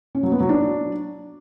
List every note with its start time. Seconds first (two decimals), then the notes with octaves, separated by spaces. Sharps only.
0.15 C#4
0.23 F#3
0.32 B3
0.40 F#3
0.49 D4